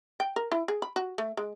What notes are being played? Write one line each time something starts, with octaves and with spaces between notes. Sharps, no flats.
G5
A#4
E4
G#4
B5
F#4
A3
G#3